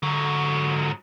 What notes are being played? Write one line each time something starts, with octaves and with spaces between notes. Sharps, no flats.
G#2 D3 F#3